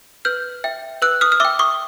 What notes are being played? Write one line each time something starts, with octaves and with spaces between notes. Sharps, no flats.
B4 F6 G6
E5 G5
B4 E6 F#6
D#6 F6
F6
E5 G5 D6 E6
C#6 D#6